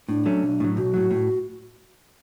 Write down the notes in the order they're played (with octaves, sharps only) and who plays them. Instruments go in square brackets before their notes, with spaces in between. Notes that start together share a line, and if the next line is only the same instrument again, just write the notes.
[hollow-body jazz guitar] A2 [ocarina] D4
[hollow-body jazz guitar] F#3 A3 C#4
B1
A2 F#3
[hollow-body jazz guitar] B1 [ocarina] F#4
[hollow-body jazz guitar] A2 F#3
A2